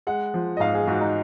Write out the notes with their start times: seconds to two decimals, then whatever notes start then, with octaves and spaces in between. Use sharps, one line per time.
0.07 G#3 F#5
0.34 F3
0.57 D#5
0.60 G#2 F5
0.75 G#4
0.87 G#2 F#4
1.01 D#4